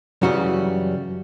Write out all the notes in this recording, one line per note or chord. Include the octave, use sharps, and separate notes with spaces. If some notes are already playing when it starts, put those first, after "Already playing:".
F#2 C#3 E3 G3 F#4